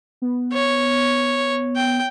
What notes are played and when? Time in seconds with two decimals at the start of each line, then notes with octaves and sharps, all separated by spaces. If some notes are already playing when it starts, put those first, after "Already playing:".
0.22 B3
0.53 C#5
1.76 G5